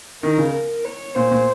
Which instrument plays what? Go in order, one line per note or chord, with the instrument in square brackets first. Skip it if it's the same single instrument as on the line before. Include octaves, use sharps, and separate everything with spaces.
[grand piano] D#3 [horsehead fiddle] A#4
[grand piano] C#3
[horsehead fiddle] A#4
C#5
[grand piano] A#2 [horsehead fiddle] C5
[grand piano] A#2